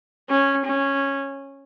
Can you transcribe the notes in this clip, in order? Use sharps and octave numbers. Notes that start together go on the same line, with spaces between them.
C#4
C#4